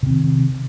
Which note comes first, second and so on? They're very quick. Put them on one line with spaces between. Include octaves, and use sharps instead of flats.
C3 C4 D#3